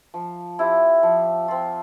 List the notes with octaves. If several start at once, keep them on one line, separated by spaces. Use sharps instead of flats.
F3
C4 E4 G4
F3
C4 F4